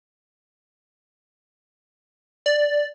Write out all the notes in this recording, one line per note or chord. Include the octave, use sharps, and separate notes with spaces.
D5